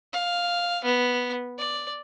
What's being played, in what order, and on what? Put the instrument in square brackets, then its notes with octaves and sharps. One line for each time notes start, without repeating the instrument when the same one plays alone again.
[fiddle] F5
B3
D5